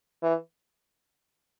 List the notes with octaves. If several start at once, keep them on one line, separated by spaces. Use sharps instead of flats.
E3